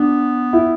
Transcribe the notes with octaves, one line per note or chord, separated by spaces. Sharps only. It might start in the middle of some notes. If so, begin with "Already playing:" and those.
Already playing: B3 D4
E4